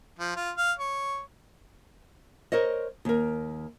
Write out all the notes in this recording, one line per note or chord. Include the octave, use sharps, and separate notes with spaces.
F3
F4
F5
C#5
A#4 C5 C#5 D#5
D#2 A#4